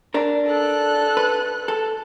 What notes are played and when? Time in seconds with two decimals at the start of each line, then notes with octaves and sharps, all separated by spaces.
0.14 D4 A#4
0.47 A4 F#6
1.17 B4
1.68 A4